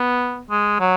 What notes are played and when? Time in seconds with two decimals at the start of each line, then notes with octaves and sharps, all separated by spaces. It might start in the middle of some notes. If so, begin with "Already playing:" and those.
Already playing: B3
0.51 G#3
0.80 F#3